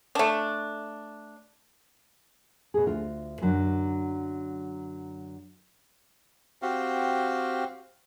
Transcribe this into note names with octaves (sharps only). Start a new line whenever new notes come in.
A3 D4
B2 G#4
D2 F4
F#2 D3 F#3
C4 F#4 G4 F5